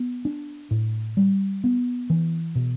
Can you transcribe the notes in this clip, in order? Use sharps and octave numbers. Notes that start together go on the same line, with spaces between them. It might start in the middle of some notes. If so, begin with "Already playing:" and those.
Already playing: B3
D4
A2
G3
B3
E3
B2